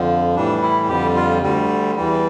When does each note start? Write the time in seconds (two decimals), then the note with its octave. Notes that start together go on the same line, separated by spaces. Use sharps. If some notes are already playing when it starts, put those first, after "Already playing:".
Already playing: F2 D3 F3
0.35 A2 E3 G3 D4
0.63 E4
0.88 F2 D3 G3 G4
1.16 F4
1.42 D2 D3 G3
1.96 E2 E3 G3